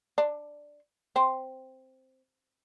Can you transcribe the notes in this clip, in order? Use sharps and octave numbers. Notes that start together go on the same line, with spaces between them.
D4
C4